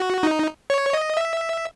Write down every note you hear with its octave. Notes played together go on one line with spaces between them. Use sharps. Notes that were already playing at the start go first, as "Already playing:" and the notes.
Already playing: F#4
D#4
C#5
D#5
E5